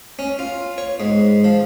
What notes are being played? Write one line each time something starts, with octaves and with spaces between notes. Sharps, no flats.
C#4
F4
C#5
G#2
F3